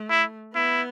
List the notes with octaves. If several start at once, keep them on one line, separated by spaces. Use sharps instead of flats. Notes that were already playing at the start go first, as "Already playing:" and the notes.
Already playing: A3
E4
B3 E4